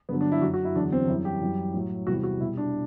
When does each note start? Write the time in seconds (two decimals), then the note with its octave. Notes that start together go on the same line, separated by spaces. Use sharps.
0.09 G2 D3 F#3 B3
0.21 D4
0.32 E4
0.42 F#2 F#3 F#4
0.54 F#4
0.65 E4
0.76 E2 D3 F#3 D4
0.92 C4
1.08 F#2 E3 G3 E4
1.25 G4
1.41 F#2 E3 G3
1.74 A2 F#3
2.07 E2 C3 E3 G3 F#4
2.23 F#4
2.40 B2 G3 E4
2.57 D4